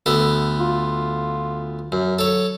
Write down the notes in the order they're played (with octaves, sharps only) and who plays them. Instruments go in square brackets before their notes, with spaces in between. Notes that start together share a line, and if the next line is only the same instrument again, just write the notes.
[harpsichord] D2 B3 A4
[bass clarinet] F4
[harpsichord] F#2 [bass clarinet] F#3
[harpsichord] A4 C#5